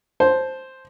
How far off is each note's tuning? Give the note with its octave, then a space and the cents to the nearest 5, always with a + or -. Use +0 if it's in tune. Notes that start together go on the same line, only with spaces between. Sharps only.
C5 +0 A5 -15